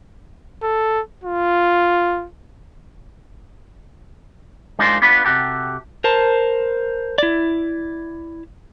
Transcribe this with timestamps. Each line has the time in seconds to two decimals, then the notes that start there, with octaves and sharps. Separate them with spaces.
0.63 A4
1.24 F4
4.79 G#3 D4 D#4 F4 A#4 C5
5.02 B3 D4 F4 B4
5.25 C3 F#4 G4 A4
6.04 A#4 C5 A5
7.18 E4 D5